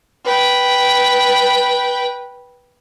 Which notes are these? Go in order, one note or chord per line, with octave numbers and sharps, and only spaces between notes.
B4 G5